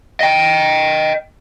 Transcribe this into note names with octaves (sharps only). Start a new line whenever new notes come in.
D#5 G5